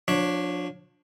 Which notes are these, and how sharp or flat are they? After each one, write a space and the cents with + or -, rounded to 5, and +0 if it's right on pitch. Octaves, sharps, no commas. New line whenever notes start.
F3 +35 D4 +0 C#5 +0